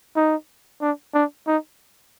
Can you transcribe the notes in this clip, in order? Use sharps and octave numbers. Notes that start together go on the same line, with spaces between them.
D#4
D4
D4
D#4